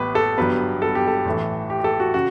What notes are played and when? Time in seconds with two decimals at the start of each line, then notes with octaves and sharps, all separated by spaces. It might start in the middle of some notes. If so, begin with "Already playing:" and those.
Already playing: A1 A2 G3 B3 B4
0.15 A4
0.37 G1 G2 F#3 B3 B4
0.82 A4
0.95 G4
1.08 A4
1.26 A1 A2 E3 A3
1.70 G4
1.80 G4
1.84 A4
2.00 F#4
2.14 C#3 F#4